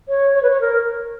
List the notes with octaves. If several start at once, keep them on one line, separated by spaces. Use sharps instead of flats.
C#5
C#5
B4
C#5
A#4